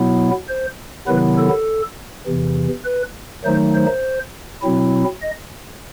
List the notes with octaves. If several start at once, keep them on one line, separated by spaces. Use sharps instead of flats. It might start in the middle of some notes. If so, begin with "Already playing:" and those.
Already playing: B2 F#3 B3 E4
C5
C3 D#3 F#3 B3 E4 B4
A4
E2 C3 E3
B4
D#3 F#3 A3 D#4 C5
C5
B2 F#3 C4 E4
D#5